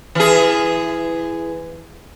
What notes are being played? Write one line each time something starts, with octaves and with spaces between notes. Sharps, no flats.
E3 G#4